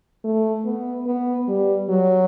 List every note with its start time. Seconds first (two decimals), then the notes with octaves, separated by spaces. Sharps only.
0.24 A3
0.65 B3
1.06 B3
1.48 G3
1.89 F#3